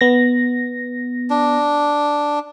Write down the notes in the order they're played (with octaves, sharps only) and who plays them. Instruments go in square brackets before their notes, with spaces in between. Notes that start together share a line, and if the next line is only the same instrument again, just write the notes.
[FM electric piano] B3 A#6
[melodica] D4